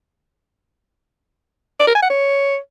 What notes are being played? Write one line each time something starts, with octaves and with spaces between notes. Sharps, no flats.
D5
A#4
G#5
F#5
C#5